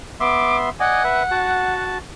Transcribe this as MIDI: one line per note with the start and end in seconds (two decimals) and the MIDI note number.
0.20 0.70 59
0.20 0.70 76
0.20 0.70 84
0.20 0.57 86
0.80 1.03 74
0.80 1.03 75
0.80 1.84 78
0.80 1.03 80
1.04 1.23 71
1.04 1.23 76
1.31 1.98 66
1.31 1.98 81